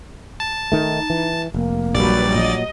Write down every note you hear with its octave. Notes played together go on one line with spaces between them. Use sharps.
A5
D#3 A3 D#4
E3
F1 A#3
A#1 F#3 G3 B4 D5 A6
A#2 F#3 D#5